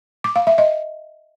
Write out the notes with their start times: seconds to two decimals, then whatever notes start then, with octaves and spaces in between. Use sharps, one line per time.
0.24 D6
0.36 F5
0.47 E5
0.58 D#5